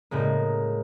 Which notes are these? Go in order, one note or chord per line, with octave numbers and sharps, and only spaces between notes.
A2 C#3 G#3 A#3